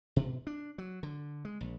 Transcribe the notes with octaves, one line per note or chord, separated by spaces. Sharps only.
B2
D4
F#3
D3
G#3
A#1